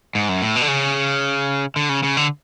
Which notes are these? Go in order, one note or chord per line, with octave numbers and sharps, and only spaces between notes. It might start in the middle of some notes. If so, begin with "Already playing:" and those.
G#2
F#2
A2
B2
D3
C#3
D3
C#3
C#3
D3